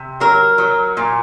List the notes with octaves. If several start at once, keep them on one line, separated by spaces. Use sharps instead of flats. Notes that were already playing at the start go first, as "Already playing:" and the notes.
Already playing: C3
F#3 A#4
F#3
A#2